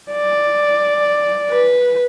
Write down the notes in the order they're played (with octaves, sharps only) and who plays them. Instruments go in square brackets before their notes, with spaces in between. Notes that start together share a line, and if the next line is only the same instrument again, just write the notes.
[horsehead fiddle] D5
B4